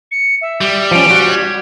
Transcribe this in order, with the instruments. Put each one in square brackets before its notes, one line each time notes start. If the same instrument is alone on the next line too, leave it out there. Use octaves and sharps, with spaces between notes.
[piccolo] C#7
E5
[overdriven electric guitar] G3
[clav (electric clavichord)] F3 C#4 [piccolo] D7
[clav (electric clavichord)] F#4 F#5
[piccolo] G#6